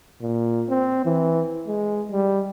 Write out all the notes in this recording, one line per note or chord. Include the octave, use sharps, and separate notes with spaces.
A#2
C4
E3
G#3
G3